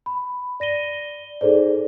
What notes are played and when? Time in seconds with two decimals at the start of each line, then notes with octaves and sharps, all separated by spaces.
0.06 B5
0.60 D5 A#6 D#7 G7
1.41 D#4 G#4 A4 C5 D5